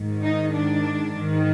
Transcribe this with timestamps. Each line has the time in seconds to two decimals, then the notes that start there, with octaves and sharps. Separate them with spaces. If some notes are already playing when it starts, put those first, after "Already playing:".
Already playing: G#2 D#3
0.22 D#4
0.52 D4
1.15 G#2 D#3